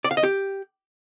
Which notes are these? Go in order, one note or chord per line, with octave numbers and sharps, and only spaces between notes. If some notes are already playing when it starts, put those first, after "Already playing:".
D5
F5
D#5
G4